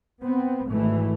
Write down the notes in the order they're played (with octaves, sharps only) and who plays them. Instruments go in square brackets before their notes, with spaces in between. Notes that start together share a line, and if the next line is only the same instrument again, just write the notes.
[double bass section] B3 C4
G#1 E3 A3